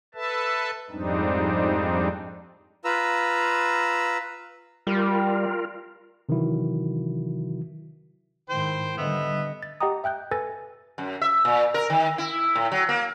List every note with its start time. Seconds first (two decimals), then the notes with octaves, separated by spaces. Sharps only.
0.15 A4 B4 E5 A5
0.90 F2 G#2 G3 C4 D4 D#4
2.84 F4 B4 A#5 E6
4.87 G3 F4 A#4
6.29 C3 D#3 E3 F#3 E4 F#4
8.49 G#2 D#3 E4 C5 G5
8.98 D3 G3 B3 D#5 E5
9.63 A6
9.81 G4 D#5 F#5 G5 A#5 D#6
10.04 E5 G5 F#6 G6
10.31 A4 B4 G#5 E6 A6 A#6
10.98 F#2
11.22 E5
11.45 A#2
11.74 A#4
11.90 D#3
12.18 E4
12.55 A2
12.72 F#3
12.89 A#3